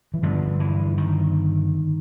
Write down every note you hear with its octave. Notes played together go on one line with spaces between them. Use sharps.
E3
G2 D3 F3
E3
D#3